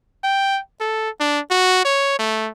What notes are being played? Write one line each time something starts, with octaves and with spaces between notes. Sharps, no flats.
G5
A4
D4
F#4
C#5
A3